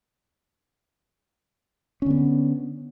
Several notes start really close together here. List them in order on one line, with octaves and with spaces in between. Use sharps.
C#4 D3 B3